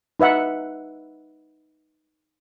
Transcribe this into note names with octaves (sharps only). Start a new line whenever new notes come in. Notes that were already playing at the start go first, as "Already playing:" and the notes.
D#4 B4 E5 F#5